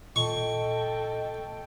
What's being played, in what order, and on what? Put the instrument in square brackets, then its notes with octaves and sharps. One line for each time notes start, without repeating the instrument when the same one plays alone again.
[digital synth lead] A#2 [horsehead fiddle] A4 G5 [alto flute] D#5 [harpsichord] C#6